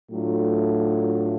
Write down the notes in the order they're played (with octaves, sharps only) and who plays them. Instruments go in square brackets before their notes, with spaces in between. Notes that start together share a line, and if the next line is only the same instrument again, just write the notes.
[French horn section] A2 F#3 A3 D4 F4